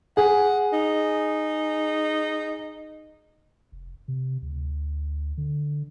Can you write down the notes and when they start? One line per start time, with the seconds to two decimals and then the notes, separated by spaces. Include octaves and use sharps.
0.17 G#4 F#5
0.73 D#4
3.72 F1
4.08 C3
4.42 D2
5.37 D3